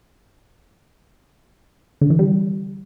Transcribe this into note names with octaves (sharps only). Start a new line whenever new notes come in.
D3
E3
G3